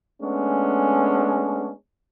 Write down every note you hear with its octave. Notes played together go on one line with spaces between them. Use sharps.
G#3 A3 B3 C#4 D4